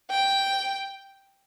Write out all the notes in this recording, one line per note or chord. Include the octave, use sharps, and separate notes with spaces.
G5